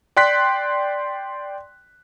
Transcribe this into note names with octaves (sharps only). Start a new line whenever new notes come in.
D5 G5 C6 F#6 B6